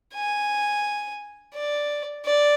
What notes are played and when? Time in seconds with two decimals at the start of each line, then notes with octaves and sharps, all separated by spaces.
0.15 G#5
1.55 D5
2.26 D5